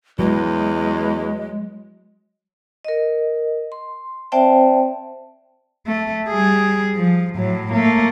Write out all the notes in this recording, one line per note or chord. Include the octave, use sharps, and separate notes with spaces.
E2 F#3 G#3
A#4 D#5
C6
C4 C5 D5 E5 G5 A5
A3
G3 G#4
F3
A2 F#3
A3 A#3